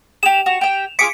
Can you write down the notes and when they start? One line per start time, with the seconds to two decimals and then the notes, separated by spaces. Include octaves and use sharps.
0.23 G4 G#4 E7 F7
0.46 F#4
0.61 G4 G5
0.99 F4 G#4 D6 B6 C#7 D7